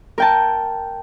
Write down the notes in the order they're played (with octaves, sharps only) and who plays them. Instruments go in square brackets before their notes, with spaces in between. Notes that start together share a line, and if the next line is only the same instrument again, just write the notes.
[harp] A#4 G5 A5